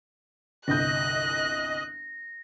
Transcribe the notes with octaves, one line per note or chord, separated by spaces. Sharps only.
G1 C2 D#5 F#6 G6 A#6